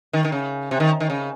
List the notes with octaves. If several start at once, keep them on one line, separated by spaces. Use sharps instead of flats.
D#3
D#3
C#3
C3
D#3
D#3
C#3